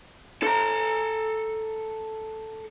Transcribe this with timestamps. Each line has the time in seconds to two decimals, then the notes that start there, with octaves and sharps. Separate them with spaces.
0.43 A4 A#5